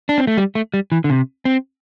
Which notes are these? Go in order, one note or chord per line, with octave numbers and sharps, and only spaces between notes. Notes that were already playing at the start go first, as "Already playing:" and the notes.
D4
C4
A3
G3
A3
G3
E3
D3
C3
C4